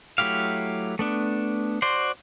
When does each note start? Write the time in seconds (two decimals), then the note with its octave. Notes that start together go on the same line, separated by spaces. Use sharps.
0.18 F#3 A3 E4 G4 F5
0.99 A3 B3 D4
1.82 F#4 C5 D5 C6